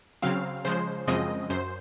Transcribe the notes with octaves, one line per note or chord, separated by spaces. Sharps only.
C#3 F#3 C4 F5
C#3 F3 G#3 C5
F#2 C#3 F3 G#3 C4 D#5
F#2 C5